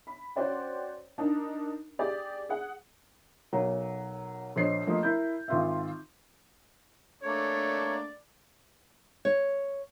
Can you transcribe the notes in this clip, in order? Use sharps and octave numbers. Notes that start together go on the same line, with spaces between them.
B5
C#4 F#4 C5 D5 G5
D4 D#4 A#4
G4 G#4 D5
G#4 F#5
B1 F#3 A#4
A#1 C5 C#5 D#5 C7
F3 A3 A#3 D#5
E4 A#4 G6
G#1 F4 E5
A3 A#3 D4 C#5 D5
C#5